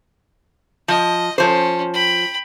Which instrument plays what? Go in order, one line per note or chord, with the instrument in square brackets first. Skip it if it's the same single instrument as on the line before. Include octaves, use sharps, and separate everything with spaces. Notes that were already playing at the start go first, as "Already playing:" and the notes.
[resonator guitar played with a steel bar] F3 [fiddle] D#5
[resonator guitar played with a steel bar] F3 C5 [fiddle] C#4
[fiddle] G5 B5